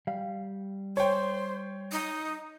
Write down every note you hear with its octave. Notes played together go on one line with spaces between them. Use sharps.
G3 F5
C5 C#5 G5
D#4